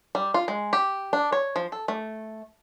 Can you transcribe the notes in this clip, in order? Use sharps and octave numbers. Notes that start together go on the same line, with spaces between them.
G3
F4
G#3
G4
D4
C#5
F3
A4
A3